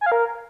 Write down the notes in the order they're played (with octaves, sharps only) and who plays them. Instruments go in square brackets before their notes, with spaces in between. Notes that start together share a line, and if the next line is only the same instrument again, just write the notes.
[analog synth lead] G#5
F5
A#4